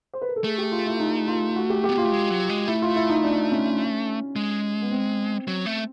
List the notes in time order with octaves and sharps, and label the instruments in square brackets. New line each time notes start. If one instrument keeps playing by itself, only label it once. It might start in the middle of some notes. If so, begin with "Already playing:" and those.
[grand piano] C5
B4
A#4
A4
[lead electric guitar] A3 [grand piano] G#4
[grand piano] G4
F4
E4
D#4
F4
F#4
G4
G4
[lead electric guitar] B3
[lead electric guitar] A#3 [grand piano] F4
[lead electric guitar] A3
G#3
F#3
G#3
[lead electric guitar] A3 [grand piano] E4
[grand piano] F4
E4
D#4
D4
C#4
[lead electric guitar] G#3
[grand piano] B3
C4
[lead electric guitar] F#3
A3